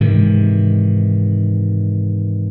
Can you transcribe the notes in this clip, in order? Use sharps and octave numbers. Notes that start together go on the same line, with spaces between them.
G#2 C3 D#3 E3